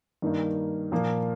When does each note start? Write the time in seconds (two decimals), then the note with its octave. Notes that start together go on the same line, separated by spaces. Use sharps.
0.22 G2 D#3 A#3 D#4
0.92 A#2 F3 A#3